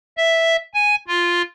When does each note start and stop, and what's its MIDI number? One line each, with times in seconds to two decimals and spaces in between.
0.18 0.56 76
0.74 0.96 80
1.08 1.42 65